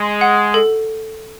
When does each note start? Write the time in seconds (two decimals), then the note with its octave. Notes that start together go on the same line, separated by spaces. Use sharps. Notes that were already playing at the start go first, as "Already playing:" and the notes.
Already playing: G#3 C6
0.21 F#5
0.54 A4